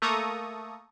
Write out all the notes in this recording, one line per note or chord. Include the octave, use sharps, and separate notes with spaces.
A3 A#3 A4 A#5 C#6 D#6